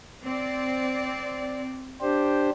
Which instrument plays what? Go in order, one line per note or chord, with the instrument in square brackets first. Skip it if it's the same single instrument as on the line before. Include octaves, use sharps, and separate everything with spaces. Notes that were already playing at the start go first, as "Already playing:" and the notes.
[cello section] C4 D5
[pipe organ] D4 G4 C5